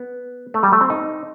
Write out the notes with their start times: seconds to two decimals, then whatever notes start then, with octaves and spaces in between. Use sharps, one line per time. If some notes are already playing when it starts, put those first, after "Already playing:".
Already playing: B3
0.54 A3
0.63 G3
0.72 A3
0.81 C4
0.90 D#4